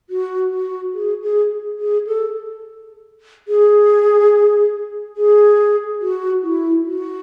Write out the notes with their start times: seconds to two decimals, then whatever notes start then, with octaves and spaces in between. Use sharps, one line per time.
0.10 F#4
0.51 F#4
0.94 G#4
1.22 G#4
1.79 G#4
2.07 A4
3.48 G#4
5.17 G#4
6.01 F#4
6.43 E4
6.85 F#4